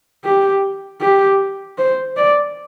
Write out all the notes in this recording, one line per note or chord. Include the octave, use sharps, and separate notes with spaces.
G4
G4
C5
D5